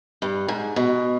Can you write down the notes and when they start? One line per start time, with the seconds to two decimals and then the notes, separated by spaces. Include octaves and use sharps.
0.22 G2
0.48 G#2
0.76 B2